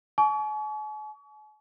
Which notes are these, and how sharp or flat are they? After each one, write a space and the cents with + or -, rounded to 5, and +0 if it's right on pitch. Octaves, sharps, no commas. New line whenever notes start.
G#5 +45 C#6 +40